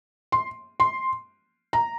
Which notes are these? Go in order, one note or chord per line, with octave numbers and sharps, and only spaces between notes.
C6
C6
A#5